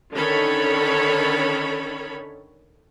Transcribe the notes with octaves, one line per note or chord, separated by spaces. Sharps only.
D3 D#3 C#4 A4 C#5 B5